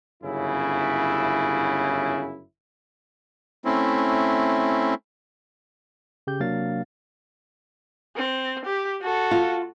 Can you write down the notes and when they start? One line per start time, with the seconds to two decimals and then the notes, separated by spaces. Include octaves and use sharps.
0.23 G1 F#2 C#3 E4
3.65 A3 C4 C#4 E4
6.27 C#3 G4 G6
6.40 C3 F#3 A#3 D4 F5 A6
8.16 C4
8.65 G4
9.02 F#4 A4
9.31 F4